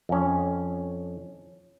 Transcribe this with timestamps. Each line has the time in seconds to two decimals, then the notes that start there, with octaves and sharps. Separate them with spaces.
0.09 F2 C#4